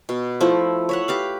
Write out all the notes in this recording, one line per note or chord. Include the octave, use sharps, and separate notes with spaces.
B2
F3 A3 E4
C#5 E5 F#5
G4 B4 F5